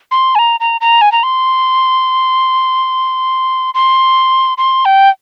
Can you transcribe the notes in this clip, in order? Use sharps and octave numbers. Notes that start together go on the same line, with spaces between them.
C6
G#5
A#5
A#5
A#5
G#5
A#5
C6
C6
C6
G5